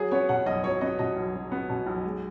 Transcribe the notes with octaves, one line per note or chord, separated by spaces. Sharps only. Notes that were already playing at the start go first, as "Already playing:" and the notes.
Already playing: F#3 G#4
B3 C#5
B2 F#5
B1 D#5
F#3 C#5
B3 D#5
B2 D#5
B1
F#3
B3
B2
B1
G#3